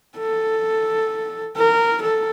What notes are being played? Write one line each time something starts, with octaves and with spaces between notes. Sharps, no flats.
A4
A#4
A4